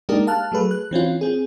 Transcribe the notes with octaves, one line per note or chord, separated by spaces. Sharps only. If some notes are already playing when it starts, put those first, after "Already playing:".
G#3 A#3 D4 D#4 G4 A#4
F5 A5 F6 F#6
F#3 A3 G#4 B4
F#6
E3 C4 C#4 F4
C4 G#4